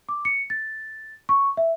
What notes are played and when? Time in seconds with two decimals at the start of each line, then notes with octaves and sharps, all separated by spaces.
0.09 D6
0.25 C#7
0.50 A6
1.29 C#6
1.57 E5